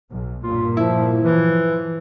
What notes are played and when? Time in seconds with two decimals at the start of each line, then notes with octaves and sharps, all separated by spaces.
0.10 B1
0.43 G2 A#2 F4
0.77 F3 E4
1.23 E3 F3